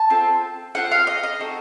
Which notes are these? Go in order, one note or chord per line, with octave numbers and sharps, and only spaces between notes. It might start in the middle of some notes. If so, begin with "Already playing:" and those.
Already playing: A5
C4 F4 A4
C4 F4 A4 F#5
F5
D#5
D#5
C4 D#4 F#4 A4